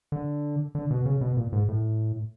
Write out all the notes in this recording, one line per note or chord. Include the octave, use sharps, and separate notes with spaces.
D3
D3
B2
C#3
B2
A#2
G#2
A2